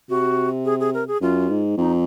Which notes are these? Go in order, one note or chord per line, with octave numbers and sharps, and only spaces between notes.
C3 F#4
G#4
G#4
A#4
G#4
F#2 F4
G#2
F2 D#4